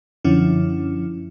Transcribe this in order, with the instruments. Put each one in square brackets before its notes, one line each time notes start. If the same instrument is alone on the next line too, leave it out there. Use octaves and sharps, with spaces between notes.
[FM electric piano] F#2 D3 F3 C#4 E4